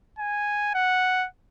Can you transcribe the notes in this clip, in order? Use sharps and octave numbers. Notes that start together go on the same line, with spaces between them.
G#5
F#5